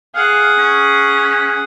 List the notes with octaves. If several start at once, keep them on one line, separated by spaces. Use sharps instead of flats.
G#4 F5 F#5
C#4